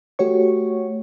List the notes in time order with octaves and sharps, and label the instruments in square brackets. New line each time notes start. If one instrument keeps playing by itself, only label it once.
[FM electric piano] A3 F#4 G4 C#5 C#6